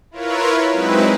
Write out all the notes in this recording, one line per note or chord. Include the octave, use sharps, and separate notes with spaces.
E4 F4 A#4 B4 C#5
F#3 G#3 C4 D#4 E4 B4